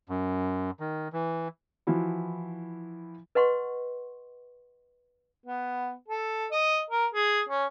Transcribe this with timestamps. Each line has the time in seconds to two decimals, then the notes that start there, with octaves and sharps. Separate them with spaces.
0.09 F#2
0.80 D#3
1.13 E3
1.87 E3 F3 E4 F#4
3.35 B4 D#5 F#5 C6 C#6
5.46 B3
6.08 A4
6.51 D#5
6.90 A#4
7.14 G#4
7.49 C#4